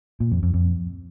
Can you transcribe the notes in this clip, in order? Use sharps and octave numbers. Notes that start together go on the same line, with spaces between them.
A#2
F2
F2
F2